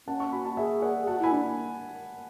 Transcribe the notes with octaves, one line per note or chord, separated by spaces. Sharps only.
C#4 F#5 A5
A5 C#6
F#4 G#5 B5
F#5 A5
G#4 E5 G#5
D5 F#5
G#4
F#4 F#5 A5
E4
G#5 B5
D4